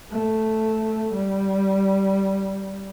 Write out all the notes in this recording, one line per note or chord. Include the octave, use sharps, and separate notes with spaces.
A3
G3